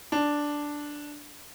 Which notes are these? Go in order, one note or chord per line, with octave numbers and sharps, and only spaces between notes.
D4